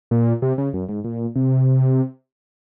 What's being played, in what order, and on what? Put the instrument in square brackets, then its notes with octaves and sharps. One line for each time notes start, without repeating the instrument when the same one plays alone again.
[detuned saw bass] A#2
C3
C#3
F#2
G#2
A#2
C3